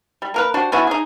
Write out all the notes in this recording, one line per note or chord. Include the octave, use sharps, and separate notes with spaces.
G3
A#3 A#4 B4
D4 F#4 G4 C5
B3 C#4 E4 F#4
D#4 G#4